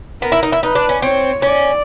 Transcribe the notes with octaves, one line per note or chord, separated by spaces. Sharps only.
B3 A#4
E4
D#4
E4
D#4 B4
D4
C#4
C4 C#5
C#4 D5